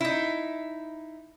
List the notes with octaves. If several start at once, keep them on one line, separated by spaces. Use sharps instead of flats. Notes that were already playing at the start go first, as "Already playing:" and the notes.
D#4 E4